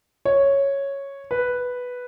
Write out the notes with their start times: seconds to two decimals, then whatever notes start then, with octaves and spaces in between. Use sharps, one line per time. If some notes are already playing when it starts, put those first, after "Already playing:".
0.25 C#5
1.31 B4